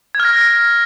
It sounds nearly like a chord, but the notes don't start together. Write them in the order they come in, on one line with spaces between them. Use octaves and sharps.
G#6 F6 A#6